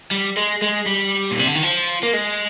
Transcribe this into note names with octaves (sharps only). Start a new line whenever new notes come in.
G3
G#3
G#3
G3
A#2
C3
D3
D#3
F3
A#3
G#3